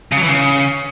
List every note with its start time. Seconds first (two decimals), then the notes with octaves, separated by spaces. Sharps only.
0.12 C#3
0.17 F#3
0.23 E3
0.28 C#3